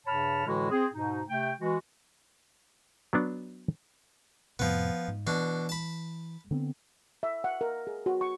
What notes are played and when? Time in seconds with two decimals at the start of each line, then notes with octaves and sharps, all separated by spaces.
0.07 G2 C#3 C#5 A5 B5 F6
0.47 A2 D3 E3 G#3 E4 F#4
0.71 C4 G#4
0.94 G#2 B2 D#4
1.29 C3 A3 G5
1.60 E3 G#3 F#4
3.13 F#3 B3 D4
4.59 F2 A2 C3 F3 B3
5.08 G#2
5.27 B2 E3 D4
5.69 A5 B5
6.51 D3 B3 C4
7.23 E5
7.44 F#5
7.61 A#4
7.87 G#4
8.06 F#4
8.21 C#6